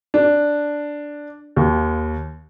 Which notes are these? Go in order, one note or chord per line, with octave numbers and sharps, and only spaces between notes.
D4
D#2